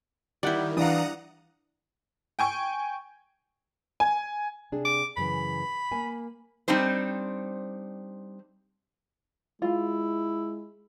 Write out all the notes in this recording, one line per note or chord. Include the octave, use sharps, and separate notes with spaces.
D#3 G3 E4 D5 F#5 G6
E3 D4 F5 F#5 A#5 D#6
G5 G#5 C#6
G#5
C3 D4 G#4
D6
F#2 C#3 E3 B5
A#3 G#5
G3 C4 D4 D#4 C5
G#3 E4 F4